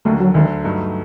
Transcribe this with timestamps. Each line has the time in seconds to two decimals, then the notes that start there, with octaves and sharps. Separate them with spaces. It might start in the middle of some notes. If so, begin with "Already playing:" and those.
0.05 D#2 D3 F#3 A3
0.20 F#3
0.34 D2 D3 D#3 F#3
0.64 G2 F#3 A3 D#4